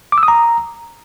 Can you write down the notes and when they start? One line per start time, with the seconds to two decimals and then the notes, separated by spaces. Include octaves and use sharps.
0.12 D6
0.18 E6
0.23 D#6
0.28 A#5